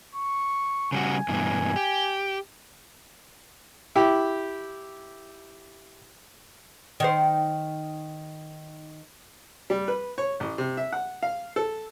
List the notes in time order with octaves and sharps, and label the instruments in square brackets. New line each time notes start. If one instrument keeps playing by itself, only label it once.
[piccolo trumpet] C#6
[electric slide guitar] C#3 G3 F#4 [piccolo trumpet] G#5
[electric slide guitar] G2 B2 E3
G4
[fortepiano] E4 G4
[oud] D#3 C5
[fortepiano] G3
B4
C#5
A1
C3
E5
F#5
F5
A4